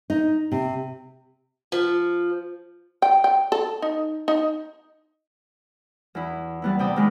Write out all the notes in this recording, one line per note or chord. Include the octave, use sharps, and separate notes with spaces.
D#4
C3
F3
G5
G5
A4
D#4
D#4
E2 E4
G3 B3 E4
C3 B3 D5 G5 D#6
D#3 G#3 B4